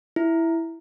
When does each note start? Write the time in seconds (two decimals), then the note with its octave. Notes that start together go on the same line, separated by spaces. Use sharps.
0.16 E4